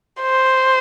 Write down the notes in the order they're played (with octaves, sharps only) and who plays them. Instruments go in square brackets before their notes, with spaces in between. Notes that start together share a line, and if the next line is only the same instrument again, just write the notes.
[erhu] C5